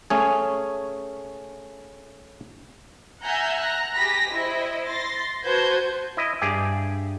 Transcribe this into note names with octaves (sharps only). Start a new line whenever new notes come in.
A3 C#4 G#4
E5 F#5 G#5 A#5 G6
A#5 F#6
G4 G#4 B5 A#6 B6
E4 C5 D#5
C6 A6 A#6
F#4 B4 C5 A5 G6 G#6
E4 D#5
G2 G4 G#4 D5 E5 A5